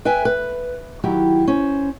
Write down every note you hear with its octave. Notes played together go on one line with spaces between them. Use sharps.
B4 E5 G5 G#5
B4
D#3 F#3 E4 G4
C#4 C5